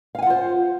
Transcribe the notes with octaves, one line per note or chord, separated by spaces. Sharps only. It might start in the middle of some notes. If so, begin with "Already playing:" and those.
F4 C5 F5 F#5 G#5